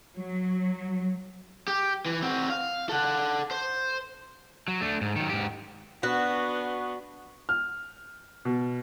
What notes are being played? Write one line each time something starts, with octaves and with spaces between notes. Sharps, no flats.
F#3
G4
E3
C4 F#4
F5
A4 F#5
C5
F#3
A3 D4
G#2
D#3 F#3
G#2 G4
B3 D4 F#4
F6
B2